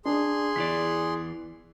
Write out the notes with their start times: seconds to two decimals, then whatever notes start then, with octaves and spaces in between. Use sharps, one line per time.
0.05 D4 G#4 C6
0.56 E2 E3 D5 B6